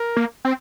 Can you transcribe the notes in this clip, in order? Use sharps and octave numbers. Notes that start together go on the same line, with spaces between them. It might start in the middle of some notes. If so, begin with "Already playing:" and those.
Already playing: A#4
A#3
C4